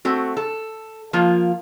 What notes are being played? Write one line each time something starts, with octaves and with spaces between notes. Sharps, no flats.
A3 C4 F#4
A4
F3 A#3 F4